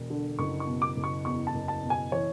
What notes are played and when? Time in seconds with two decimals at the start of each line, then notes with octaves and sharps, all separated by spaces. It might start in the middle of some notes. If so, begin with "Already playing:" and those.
Already playing: E1
0.10 D3
0.38 F#1 C#6
0.60 C#6
0.67 B2
0.82 D6
0.96 F#1
1.04 C#6
1.25 E2 C#6
1.47 A5
1.54 F#1
1.68 A5
1.84 B2
1.90 G#5
2.12 E3 C#5